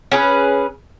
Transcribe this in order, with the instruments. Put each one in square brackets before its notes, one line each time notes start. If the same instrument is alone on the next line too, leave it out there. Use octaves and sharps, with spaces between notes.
[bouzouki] C#4 G#4 B4